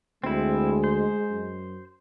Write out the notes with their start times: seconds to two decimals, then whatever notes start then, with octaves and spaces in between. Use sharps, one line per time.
0.24 D2 G#3 C4 E4
0.84 C5
1.30 F#2